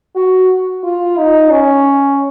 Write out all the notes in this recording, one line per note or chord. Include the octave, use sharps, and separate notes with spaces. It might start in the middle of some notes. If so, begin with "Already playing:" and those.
F#4
F4
D#4
C#4